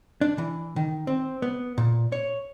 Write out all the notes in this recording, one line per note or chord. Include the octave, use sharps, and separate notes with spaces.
D4
E3
D#3
C4
B3
A#2
C#5